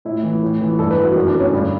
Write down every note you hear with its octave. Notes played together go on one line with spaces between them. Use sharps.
A2 E4
E3
A2
E3
G2 A4
B4
E3
F#4
F#2 F#4
D4
D3
C#4
G2